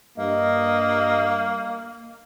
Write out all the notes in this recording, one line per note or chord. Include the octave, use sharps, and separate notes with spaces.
G2 A#3 D#5